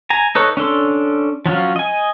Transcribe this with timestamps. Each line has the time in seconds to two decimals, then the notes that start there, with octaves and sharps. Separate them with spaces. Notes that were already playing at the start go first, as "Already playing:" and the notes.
0.10 G#5 A#5
0.35 D#4 A4 B4 C#5
0.57 C#4 D4 A4 C6
1.46 F3 F#3 C#4 F4
1.76 D#5 G#5